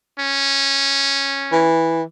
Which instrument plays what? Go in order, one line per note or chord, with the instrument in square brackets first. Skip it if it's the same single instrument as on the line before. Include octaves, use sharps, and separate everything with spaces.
[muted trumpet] C#4
[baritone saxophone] E3